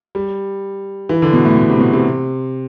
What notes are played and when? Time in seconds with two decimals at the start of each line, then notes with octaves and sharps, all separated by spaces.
0.15 G3
1.09 E3
1.22 D3
1.33 B2
1.45 A2
1.57 B2
1.70 C3
1.80 B2
1.93 C3